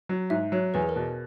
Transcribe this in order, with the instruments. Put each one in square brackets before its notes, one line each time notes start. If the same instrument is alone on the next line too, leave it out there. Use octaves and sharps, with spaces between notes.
[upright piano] F#3
[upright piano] G#2 [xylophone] E5
[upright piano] F#3 [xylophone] C#5
[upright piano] E2 [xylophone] B4
[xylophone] G#4
A#4
[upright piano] B2